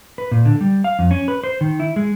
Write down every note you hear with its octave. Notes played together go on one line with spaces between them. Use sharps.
B4
A#2
D3
G3
F5
F2
C#4
B4
C5
D#3
E4
G#3